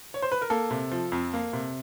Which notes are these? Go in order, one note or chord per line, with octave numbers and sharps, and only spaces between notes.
C#5
C5
B4
A#4
A#3 A4
C3
F3
F2
A#3
C3